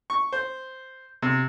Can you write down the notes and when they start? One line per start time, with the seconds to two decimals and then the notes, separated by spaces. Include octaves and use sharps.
0.10 C#6
0.32 C5
1.22 C3